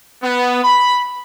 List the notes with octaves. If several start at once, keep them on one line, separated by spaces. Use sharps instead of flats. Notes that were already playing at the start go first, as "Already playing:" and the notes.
B3
B5